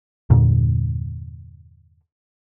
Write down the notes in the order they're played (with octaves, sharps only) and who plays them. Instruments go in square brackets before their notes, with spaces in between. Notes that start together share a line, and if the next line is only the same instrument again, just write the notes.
[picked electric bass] E2 G2 A#2 D3